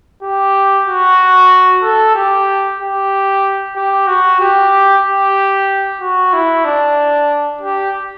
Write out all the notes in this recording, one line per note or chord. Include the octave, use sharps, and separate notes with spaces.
G4
F#4
A4
G4
G4
G4
F#4
G4
G4
F#4
E4
D4
G4